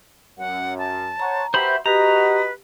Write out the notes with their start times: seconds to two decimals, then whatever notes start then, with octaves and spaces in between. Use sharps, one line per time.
0.38 F#2 F#5
0.79 A5
1.20 C5 C#5 F#5 A#5
1.54 F#4 G4 B4 C5 E5 B5
1.86 F#4 G4 B4 D#5 A#5